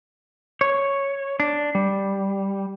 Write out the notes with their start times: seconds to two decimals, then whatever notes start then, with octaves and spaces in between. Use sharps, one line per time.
0.61 C#5
1.40 D4
1.75 G3